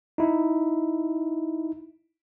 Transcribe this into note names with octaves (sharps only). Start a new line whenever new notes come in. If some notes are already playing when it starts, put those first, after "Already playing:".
D#4 E4